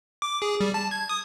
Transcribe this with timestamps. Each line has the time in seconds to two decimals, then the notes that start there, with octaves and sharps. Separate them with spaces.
0.22 D6
0.42 G#4
0.61 G3
0.74 A5
0.91 G#6
1.09 D#6